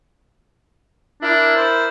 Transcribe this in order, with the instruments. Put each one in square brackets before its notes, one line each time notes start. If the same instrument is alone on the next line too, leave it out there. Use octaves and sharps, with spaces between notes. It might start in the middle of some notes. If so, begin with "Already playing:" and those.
[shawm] D4 [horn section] E4 A#4 D5
[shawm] C5